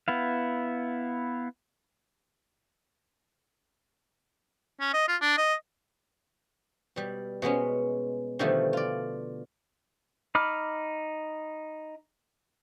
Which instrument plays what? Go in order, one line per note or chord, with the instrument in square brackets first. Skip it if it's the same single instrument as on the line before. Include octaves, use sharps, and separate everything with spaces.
[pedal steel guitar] B3 E4 F5
[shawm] C#4
D#5
F4
D4
D#5
[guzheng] B2 G3
B2 G#3 B3 C#4
B2 D3 D#3 F3 G3 A3
F4 D5
[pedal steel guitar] D#4 B5 D6 F6